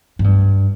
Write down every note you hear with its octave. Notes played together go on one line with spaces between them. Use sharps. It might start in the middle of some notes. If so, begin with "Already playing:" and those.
G#2
G2